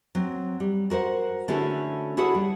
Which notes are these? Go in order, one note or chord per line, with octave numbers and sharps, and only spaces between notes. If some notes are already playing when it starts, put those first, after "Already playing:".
F#3 C4
G3
F#4 A#4 C5 F#5
D3 A3 C#4 E4 F#4 G#4
E4 F#4 G#4 A4 C#5 F#5
G3